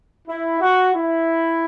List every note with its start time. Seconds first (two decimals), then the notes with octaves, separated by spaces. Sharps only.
0.28 E4
0.61 F#4
0.94 E4